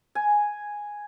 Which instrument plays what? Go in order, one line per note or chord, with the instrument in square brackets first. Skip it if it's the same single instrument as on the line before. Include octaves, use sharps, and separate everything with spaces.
[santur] G#5